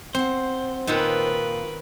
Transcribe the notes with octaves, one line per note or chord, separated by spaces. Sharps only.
C4 C5 F#5
A#2 D#3 B3 C4 F4 A#4 B4